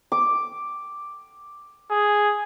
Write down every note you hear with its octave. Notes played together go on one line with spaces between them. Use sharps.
D6
G#4